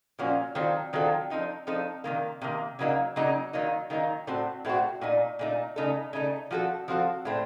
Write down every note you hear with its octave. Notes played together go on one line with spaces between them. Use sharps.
A#2 F3 A#3 C#4 F#4
D#3 F#3 C4 F4 A4
D#3 F#3 C4 F4 A4
F3 C4 D#4 A4
F3 C4 D#4 A4
C3 D#3 A#3
C3 D#3 A#3
C#3 F#3 A#3 D#4
C#3 F#3 A#3 D#4
D#3 F#3 A#3 D#4
D#3 F#3 A#3 D#4
A2 A3 C4 F#4
A2 A3 C4 F#4
A#2 A3 D#4
A#2 A3 D#4
C#3 A3 D#4 A4
C#3 A3 D#4 A4
F3 C4 F#4 A4
F3 C4 F#4 A4
A2 A3 C4